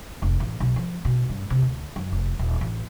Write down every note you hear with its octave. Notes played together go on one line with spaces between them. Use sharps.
F1
A1
B1
F3
B2
G2
C3
D2
F#2
F1
D#1
A1